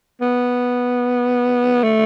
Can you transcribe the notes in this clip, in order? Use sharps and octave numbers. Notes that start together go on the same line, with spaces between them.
B3
A3